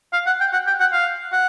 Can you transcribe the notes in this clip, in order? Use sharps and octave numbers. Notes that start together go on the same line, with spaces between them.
F5
F#5
G5
F#5
G5
F#5
F5
F#5